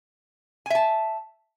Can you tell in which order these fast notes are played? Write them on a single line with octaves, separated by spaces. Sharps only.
G#5 E5 A5